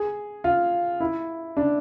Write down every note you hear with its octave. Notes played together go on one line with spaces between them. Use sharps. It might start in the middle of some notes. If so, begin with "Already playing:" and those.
Already playing: G#4
F4
E4
D4